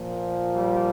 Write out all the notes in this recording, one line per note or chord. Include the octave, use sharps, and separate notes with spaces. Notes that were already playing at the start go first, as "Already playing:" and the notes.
Already playing: A#2 F3
G3